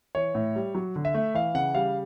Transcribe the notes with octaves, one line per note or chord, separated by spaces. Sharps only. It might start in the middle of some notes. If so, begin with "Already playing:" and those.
E3 C#5
A2
G3
F#3
D3
E5
A3
E3 F5
C#3 F#5
G3 F5